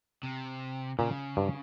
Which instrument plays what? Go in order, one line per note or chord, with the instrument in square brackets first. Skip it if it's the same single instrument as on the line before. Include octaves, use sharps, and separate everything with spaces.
[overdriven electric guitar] C3
[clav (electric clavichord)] A#2 [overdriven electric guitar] C#3
[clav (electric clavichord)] G2